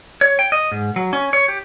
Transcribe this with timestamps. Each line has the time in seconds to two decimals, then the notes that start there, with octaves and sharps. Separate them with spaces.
0.21 C#5
0.39 G5
0.52 D#5
0.72 G#2
0.96 F#3
1.13 C#4
1.33 C#5
1.48 G4